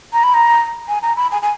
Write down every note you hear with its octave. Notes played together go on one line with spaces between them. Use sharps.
A#5
B5
A#5
G#5
A#5
B5
G#5
G#5